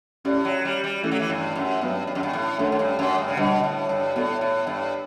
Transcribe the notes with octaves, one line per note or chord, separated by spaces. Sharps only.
A2 C#4 G4 D5
F#3
G3
G3
E3 A3 C#4 E4 A4
F#3
E3
G2
F#2
G2 F#3 B3 F#4 B4 E5
G2
F#2
G2
A2
F#2 A3 D4 A4
F#2
G2
F#2
G2
C#3
B2 D3 G3 D4
A2
G2
A2 B3 F#4 A4 D5
A2
G2